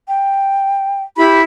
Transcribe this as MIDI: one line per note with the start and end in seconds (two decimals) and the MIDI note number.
0.08 1.03 79
1.17 1.43 64
1.17 1.40 67
1.17 1.43 83